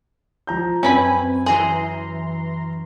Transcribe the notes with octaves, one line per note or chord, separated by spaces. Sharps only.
F3 A#5 G6
F#2 C4 C#4 B4 G#5 B5
E3 G#4 A#5 C6